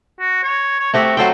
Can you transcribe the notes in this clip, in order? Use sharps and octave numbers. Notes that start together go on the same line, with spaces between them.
F#4
C#5
C#5
A3 C4 F#4 G4
F#3 A4 C5 G5